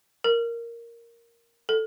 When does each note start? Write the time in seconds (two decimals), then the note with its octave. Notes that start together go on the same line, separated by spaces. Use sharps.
0.24 A#4
1.69 A4